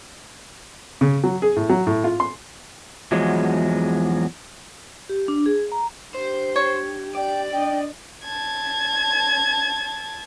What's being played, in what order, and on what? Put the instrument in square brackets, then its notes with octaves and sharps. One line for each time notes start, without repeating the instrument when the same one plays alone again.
[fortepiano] C#3
F#3
G#4
A2
F#3
A2
F4
C6
[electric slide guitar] E2 F3 F#3 G#3
[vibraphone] G4
D4
G#4
A#5
[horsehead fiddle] D4 G4 [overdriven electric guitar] C5
[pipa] C#5
[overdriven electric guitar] D5 [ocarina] G5
[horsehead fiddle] D4 D#5 [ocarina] G5
[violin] A5 G#6